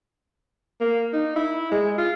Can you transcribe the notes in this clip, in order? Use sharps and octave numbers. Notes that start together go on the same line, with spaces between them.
A#3
D#4
E4
G#3
F4